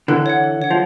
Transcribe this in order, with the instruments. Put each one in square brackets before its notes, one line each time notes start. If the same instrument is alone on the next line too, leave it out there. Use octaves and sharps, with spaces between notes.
[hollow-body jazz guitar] D3 E3 [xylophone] A4
[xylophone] C#5 F#5
A4
C#5 F#5
[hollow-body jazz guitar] F3